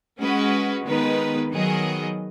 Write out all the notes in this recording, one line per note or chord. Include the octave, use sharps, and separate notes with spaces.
G#3 C#4 F#4 B4
D#3 G#3 B3 D#4 B4
D#3 F#3 B3 G#4 D#5